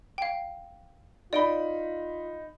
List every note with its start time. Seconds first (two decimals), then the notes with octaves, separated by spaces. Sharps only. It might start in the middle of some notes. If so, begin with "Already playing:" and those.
0.18 F5 G5
1.33 D#4 F4 D5 B5 D7 G7